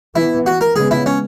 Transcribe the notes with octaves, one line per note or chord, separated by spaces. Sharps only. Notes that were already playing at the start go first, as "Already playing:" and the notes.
E3 B3 E4
F#4
A#4
C#3 G#3 B3 G#4
E4
C#4